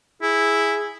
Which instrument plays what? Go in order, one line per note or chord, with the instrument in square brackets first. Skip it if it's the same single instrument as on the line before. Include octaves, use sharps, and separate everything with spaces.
[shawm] E4 [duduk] G#4